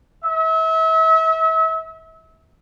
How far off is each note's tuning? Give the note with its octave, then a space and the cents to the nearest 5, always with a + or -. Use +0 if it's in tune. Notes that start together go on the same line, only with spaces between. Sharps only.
E5 -35